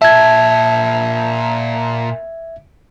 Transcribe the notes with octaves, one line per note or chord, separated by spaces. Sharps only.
A#2 E5 A5 G#6